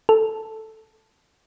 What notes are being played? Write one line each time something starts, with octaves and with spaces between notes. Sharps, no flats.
A4